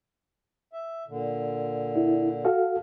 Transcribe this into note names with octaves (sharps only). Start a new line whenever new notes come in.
E5
A#2 D3
E4
F#4 A4 F5